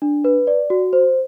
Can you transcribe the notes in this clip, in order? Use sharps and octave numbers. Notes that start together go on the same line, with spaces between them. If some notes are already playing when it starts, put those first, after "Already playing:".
D4
B4
D5
F#4
C5